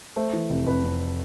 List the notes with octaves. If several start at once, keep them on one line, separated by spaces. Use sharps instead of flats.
A3 C5
E3
F1
F1 B4
F2